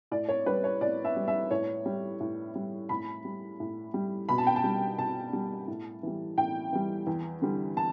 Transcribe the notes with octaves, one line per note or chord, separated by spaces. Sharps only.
A2 D5
C#5
G3 B4
C#5
A2 D5
E5
G3
E5
A2 C#5
G3
A2
G3
A2 B5
G3
A2
G3
B2 B5
A5
G5
A5
G3
B2 A5
G3
A2
E3 G3
A2 G5
E3 G3
E2
D3 G3
A5